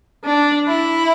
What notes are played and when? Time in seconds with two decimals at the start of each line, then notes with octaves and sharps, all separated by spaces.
0.25 D4
0.67 E4